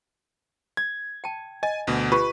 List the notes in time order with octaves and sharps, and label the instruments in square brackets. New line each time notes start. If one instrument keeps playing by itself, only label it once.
[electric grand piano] G#6
[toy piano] G5 A5
[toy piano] D#5 [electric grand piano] G#5
[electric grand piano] D2 B2
[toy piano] F4 G4 [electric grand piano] B4